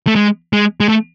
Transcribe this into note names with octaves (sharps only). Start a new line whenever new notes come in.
A3
G#3
G#3
G#3
A3